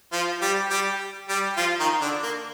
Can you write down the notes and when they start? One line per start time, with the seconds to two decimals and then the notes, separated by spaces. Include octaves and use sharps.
0.13 F3 F4
0.42 G3 G4
0.71 G3 G4
1.29 G3 G4
1.57 F3 F4
1.80 D#3 D#4
2.01 D3 D4
2.23 A#3